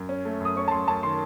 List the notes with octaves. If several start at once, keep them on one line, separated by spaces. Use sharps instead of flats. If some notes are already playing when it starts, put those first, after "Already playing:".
Already playing: F#2
C#4
A3
F#2 D#6
C#4 C#6
A5
F#2 C6
F#2 A5
D#3 C6